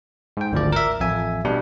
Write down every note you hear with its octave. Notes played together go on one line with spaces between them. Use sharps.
G#2 G5
G#1 D2 F3 D5
A#4 E5
A1 F2 E5 G#5
B2 G3 D4